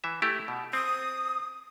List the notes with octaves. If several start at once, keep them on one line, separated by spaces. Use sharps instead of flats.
E3 E5
A3 E4 G4
B2
C4 D#6